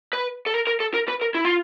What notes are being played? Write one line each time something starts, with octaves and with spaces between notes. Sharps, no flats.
B4
A4
A#4
A#4
A4
A#4
B4
A#4
E4
F4